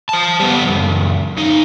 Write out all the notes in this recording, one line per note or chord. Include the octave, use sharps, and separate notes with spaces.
C5 A5
G3 B3
C#2 F#2
C#2 D#4